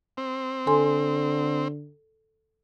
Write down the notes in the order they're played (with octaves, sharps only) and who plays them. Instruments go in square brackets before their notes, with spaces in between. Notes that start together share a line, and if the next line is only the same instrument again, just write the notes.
[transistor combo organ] C4
[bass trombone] D3 [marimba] A4 G#5 C6